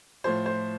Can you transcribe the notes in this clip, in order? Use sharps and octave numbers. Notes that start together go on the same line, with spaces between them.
A2 F3 C5
C5